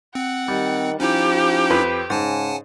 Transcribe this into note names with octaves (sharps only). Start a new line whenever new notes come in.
C4 F#5
D#3 G3
F3 C#4 D#4 E4 G4
F2 B4
G#2 C#3 F#5 G#5 A5